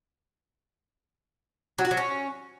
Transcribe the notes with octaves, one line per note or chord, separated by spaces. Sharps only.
F#3
F#4
F#3
C#4